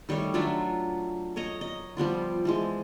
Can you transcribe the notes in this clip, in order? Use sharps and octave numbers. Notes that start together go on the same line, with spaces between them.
D#3 G3 A3 C#5
F#3 D4 F4 E5
A#4 C#5 D#5 A#5
D#5
F3 G3 B3 F4
E3 F3 G#3